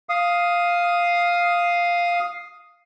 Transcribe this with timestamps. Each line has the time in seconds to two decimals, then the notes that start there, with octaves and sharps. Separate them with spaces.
0.09 F5 D#6